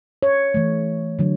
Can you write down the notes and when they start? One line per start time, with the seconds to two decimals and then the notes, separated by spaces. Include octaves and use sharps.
0.23 C#5
0.54 E3 A3
1.19 D3 F#3